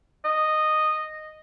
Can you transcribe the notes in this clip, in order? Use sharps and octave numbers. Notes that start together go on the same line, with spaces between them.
D#5